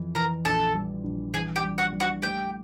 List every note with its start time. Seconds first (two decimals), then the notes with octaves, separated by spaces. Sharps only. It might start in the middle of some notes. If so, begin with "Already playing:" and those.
Already playing: F2 E3
0.15 E3 A#4 A#5
0.45 A#1 A4 A5
0.75 G3
1.04 A#1
1.34 E3 G#4 G#5
1.56 G4 G5
1.63 G3
1.78 F#4 F#5
1.92 G3
2.00 F#4 F#5
2.22 A3 G4 G5